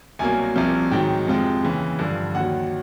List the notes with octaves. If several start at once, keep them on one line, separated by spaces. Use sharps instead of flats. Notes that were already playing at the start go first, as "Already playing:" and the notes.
C2 B2 F#3 A#3 G#5
C2 C3 F3
G#2 D#3 F#3 G5
F2 C3 F3 G#3
D#2 C#3 E3
G2 D3 F3
D#2 D#3 F#3 F#5